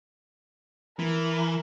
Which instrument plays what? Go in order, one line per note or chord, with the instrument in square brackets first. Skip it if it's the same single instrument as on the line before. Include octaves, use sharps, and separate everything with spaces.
[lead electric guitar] E3 [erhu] A#4